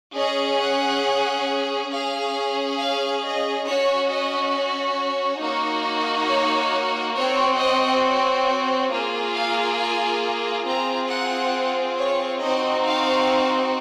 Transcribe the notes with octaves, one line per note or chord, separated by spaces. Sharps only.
C#4 G#4 D#5
F#5
C#4 G#4 F5
F5
D#5
C#4 F#4 C#5
D#5
C#5
A#3 D#4 F#4
C#5
C4 F#4 C#5
D#5
C#5
A#3 F4 G#4
F5
G#5
C4 F4 G#4 A#5
F#5
C#5
C4 D#4 F#4 D#5
F5